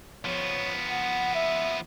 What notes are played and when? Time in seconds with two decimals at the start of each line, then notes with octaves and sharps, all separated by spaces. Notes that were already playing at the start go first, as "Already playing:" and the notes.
0.25 F3 B3 C#5
0.89 F#5
1.35 E5